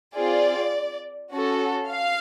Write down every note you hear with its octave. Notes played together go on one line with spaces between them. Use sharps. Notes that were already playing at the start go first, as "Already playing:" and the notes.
C4 F4 G#4 D5
C#4 F#4 A4
F5